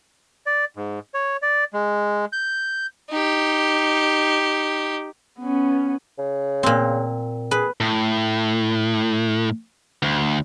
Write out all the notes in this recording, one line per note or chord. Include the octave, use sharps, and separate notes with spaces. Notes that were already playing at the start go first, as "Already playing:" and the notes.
D5
G#2
C#5
D5
G#3
G6
D#4 G4
B3 C#4
C#3
A#2 C4
G#4 B4
A2
D2